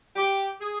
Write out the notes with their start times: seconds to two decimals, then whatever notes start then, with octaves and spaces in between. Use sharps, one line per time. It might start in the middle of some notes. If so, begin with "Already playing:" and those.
0.16 G4
0.61 G#4